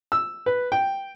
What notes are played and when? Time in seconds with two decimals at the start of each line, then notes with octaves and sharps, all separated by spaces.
0.12 E6
0.46 B4
0.72 G5